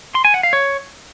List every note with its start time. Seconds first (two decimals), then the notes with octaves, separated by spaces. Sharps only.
0.15 C6
0.25 G#5
0.34 F#5
0.43 F5
0.53 C#5